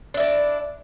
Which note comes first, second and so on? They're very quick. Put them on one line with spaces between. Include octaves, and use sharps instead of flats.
D4 E4 D5